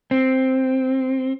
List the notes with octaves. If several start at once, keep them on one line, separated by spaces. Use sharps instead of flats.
C4